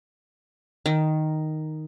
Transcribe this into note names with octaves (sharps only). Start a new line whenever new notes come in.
D#3